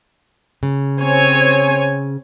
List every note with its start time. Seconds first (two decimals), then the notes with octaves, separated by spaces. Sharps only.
0.63 C#3
1.01 C4 C#5 G#5